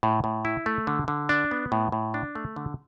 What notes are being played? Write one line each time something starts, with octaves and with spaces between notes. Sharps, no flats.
A2
A2
E4
A3
D3
D3
D4
B3
A2
A2
D4
A3
D3